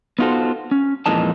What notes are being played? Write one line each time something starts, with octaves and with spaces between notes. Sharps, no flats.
B3 D#4 F4 F#4 A4 C5
C#4
F2 A#2 E3 G#3 D#4 A5